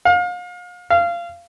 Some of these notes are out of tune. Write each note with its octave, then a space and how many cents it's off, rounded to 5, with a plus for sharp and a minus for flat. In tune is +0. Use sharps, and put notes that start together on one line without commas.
F5 +35
F5 -20